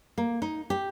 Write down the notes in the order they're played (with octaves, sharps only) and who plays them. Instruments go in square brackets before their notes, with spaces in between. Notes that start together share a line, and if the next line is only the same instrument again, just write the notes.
[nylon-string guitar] A#3
D#4
G4